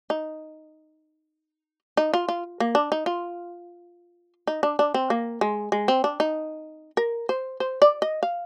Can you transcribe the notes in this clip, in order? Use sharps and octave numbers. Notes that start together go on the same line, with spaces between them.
D#4
D#4
F4
F4
A#3
D4
D#4
F4
D#4
D4
D4
C4
A#3
G#3
G#3
C4
D4
D#4
A#4
C5
C5
D5
D#5
F5